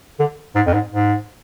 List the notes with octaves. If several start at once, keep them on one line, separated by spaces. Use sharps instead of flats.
D3
G#2
F2
G#2
G#2